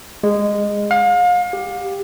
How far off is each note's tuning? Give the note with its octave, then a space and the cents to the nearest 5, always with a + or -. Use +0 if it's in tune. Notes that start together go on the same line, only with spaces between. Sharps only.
G#3 -15
F5 +35
G4 +10